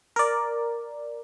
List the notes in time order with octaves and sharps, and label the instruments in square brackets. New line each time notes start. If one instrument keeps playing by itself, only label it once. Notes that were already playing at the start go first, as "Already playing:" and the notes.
[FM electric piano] A#4 D5